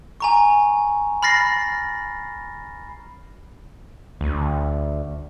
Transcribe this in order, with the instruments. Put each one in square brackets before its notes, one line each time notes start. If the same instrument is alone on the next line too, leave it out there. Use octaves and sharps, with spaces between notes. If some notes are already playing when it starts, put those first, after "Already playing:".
[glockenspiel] G#5 A#5 C#6
B5 F6 A6 A#6 C7
[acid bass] D2